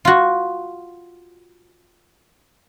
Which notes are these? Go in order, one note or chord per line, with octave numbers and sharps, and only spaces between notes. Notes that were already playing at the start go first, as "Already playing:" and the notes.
F4 F#4